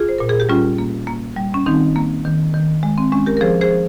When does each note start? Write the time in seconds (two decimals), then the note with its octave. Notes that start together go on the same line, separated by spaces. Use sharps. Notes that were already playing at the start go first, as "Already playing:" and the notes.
Already playing: F4 G#4
0.09 C5
0.18 A#2 A#4
0.29 G#4
0.40 G4
0.49 G3 C#4 F4
0.78 A#3
1.07 A#3
1.36 G3
1.54 C#4
1.66 D#3 C4 D#4
1.96 A#3
2.25 D#3
2.54 D#3
2.83 G#3
2.98 C4
3.12 G#3 C#4
3.26 G4 A#4
3.37 A#4
3.41 F3 G#4 C5
3.61 G#4 C5
3.71 F3